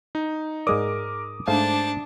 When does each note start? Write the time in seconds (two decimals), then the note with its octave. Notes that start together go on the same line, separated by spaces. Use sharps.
0.15 D#4
0.67 G#2 G#3 A#4 D5 D6 D#6
1.47 G#2 A3 D4 C5 F5 A5